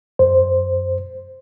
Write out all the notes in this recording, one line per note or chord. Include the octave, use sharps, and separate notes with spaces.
F#2 C5